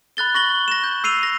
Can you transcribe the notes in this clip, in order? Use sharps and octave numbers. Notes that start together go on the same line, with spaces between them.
B5 F#6 A6 G7
C#6 A#6 F#7 G7
A#6 E7
G6
E6 C7 D#7 F7
A#6